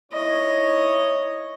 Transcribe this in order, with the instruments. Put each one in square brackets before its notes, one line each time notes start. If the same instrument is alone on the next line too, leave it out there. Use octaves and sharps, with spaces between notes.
[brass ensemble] D#4 E4 C#5 [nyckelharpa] D#5